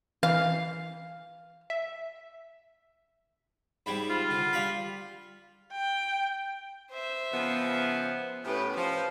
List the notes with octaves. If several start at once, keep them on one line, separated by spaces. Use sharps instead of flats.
E3 F5
E5
G#2 G3 C4 B5
F4 B5
D3
G3 F5 B5
G5
C5 E5
C#3 F3 B3
A2 B3 C#4 G4 B4
F3 C5